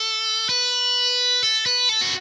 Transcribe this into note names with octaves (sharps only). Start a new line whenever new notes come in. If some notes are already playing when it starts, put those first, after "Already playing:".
Already playing: A4
B4
A4
B4
A4
F#4